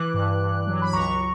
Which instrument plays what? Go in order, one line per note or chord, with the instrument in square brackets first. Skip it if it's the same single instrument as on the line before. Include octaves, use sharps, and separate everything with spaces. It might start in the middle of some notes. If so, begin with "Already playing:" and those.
Already playing: [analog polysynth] E3 D6 F#6
G2
G2
F#3
B5
C#2 A#5 C#6